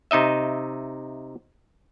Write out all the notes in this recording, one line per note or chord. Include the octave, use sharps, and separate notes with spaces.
C3 D#4 D#5 E5